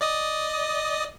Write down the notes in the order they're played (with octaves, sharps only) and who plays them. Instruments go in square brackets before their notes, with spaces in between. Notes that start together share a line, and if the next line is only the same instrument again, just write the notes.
[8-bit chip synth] D5 D#5 D#6